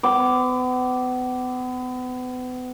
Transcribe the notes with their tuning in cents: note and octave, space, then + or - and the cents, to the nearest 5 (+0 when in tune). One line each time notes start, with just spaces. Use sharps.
B3 +35 D6 +0